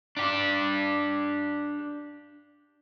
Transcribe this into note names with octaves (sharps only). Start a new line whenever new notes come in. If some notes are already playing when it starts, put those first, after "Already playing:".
D4 G4